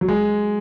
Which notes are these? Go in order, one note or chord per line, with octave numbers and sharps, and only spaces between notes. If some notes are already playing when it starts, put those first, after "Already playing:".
F#3
G#3